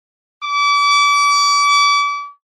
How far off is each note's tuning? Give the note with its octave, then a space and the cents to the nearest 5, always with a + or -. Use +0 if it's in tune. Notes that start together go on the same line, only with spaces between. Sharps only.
D6 -35